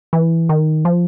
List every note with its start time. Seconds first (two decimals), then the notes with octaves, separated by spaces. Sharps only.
0.13 E3
0.49 D#3
0.85 F3